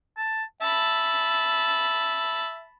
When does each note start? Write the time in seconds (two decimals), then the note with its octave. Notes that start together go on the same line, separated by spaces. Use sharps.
0.18 A5
0.62 E5 A5 B5